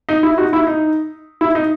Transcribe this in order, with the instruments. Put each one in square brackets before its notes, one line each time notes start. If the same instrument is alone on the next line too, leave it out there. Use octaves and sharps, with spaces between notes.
[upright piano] D#4
E4
D#4 F#4
E4
D#4
E4
D#4